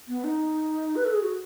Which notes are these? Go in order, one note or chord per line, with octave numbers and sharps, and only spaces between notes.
B3
D#4
B4
A4
G#4
F#4